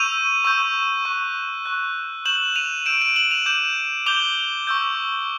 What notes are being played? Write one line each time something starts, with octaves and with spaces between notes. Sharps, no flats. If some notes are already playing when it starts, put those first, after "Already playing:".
Already playing: C#6 E6 G6 D#7 F7
C#6 E6 G6
C#6 F#6
C#6 F#6
C#6 E6 G6 E7 F#7
D#7 F7
C#6 E6 G6 D7 E7
D7 E7
E7 F#7
D#7 F7
D6 G6 E7 F#7
D6 G6 F7 G7
C#6 E6 G6